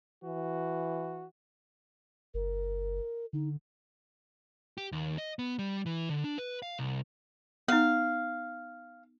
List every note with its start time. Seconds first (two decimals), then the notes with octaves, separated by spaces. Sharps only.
0.24 E3 F#4
2.34 F#1 A#4
3.33 D3 D#4
4.78 G4
4.92 D#2
5.18 D#5
5.39 B3
5.59 G3
5.86 E3
6.09 D3
6.24 D4
6.38 B4
6.62 F5
6.79 C2
7.68 B3 D#4 F5